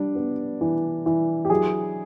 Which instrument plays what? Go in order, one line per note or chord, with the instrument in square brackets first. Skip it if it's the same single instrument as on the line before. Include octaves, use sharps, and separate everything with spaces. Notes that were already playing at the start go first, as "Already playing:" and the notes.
Already playing: [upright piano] G3 D4 D5
B3
E3
E3
G4
F#3 G#4